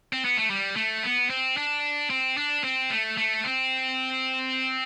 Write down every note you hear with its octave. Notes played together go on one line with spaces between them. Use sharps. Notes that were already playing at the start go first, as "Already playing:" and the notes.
C4
B3
A3
G3
A3
B3
C4
D4
C4
D4
C4
A3
A3
C4